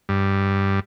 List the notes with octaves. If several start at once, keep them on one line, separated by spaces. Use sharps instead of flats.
G2